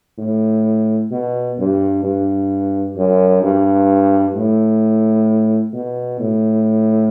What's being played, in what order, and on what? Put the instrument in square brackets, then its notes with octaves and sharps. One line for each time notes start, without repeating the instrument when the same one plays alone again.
[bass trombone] A2
B2
G2
G2
F#2
G2
A2
B2
A2